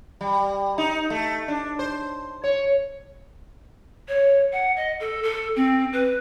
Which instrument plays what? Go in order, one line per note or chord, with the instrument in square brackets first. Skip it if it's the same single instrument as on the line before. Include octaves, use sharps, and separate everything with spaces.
[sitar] G3
D#4
A3
D4
C5
C#5
[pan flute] C#5
F#5
D#5
A4
A4
C4
B4